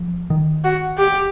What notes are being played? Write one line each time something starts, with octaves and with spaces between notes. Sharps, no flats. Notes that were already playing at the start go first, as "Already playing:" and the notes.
Already playing: F3
D#3
F#4
G4